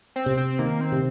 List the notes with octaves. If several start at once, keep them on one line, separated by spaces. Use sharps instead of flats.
C4
C3
C4
D#3 A#3
C4
C3